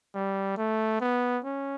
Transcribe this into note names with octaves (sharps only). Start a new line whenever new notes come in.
G3
A3
B3
C#4